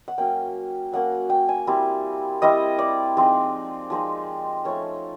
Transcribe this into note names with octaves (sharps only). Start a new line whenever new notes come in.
F#5
F#3 A#3 C#4 G5
F#3 A#3 C#4 F#5
G5
G#5
G3 C4 E4
G3 C4 E4 D#5
D5
F3 G#3 C4 D#4
F3 G#3 C4 D#4
F3 A3 C#4 C#5